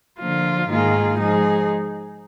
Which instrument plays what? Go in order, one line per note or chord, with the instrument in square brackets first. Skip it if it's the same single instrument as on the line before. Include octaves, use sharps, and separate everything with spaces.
[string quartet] D3 F3 A#3 F4
G#2 D#3 A#3 F4 G#4
F3 G#3 D#4 G#4